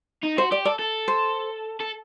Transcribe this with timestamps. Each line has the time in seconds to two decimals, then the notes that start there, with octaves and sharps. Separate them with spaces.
0.23 D#4
0.38 F#4 C5
0.51 G4 D5
0.65 A4 D5
0.79 A4
1.08 C5
1.80 A4